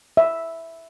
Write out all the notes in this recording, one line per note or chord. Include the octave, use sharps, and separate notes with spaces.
E5